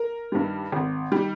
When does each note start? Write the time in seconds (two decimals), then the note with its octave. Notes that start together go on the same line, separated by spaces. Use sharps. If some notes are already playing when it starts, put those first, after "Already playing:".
Already playing: A#4
0.32 G2 D#3 G3
0.72 G#1
1.12 D#3 G3